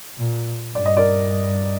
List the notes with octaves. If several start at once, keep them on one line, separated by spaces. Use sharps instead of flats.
A#2
G2 D5
D#5
A#4 D5